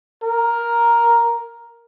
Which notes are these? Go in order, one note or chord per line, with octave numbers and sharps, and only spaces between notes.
A#4